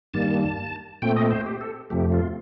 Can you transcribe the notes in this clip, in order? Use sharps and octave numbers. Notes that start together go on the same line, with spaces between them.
G2 D#3 G3 A#3 A5
A#2 A3 C4 G5
D#5
C5
G4
A4
F2 C3 F3 A3 G4
F4